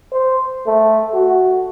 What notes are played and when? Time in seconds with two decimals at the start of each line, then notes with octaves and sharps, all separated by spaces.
0.13 C5
0.66 A3
1.14 F#4